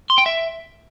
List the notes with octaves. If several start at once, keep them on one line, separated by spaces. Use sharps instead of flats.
C6
G5
E5